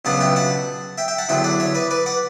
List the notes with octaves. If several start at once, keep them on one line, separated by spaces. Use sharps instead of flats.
C#2 B2 F#3 B3 D4 F#5 A5
E5 G5
F#5 A5
E5 G5
E5 G5
F#5 A5
E2 D3 F#3 E5 G5
D5 F#5
C#5 E5
B4 D5
B4 D5
D5 F#5